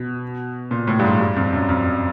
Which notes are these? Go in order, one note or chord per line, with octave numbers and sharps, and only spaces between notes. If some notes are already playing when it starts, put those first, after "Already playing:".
Already playing: B2
A#2
A2
G2
G#2
G2
F2
F#2
F2